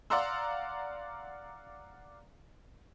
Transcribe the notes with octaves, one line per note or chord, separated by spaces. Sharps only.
D5 F5 F#5 A#5 C6 E6